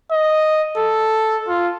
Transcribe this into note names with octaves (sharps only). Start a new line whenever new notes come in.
D#5
A4
F4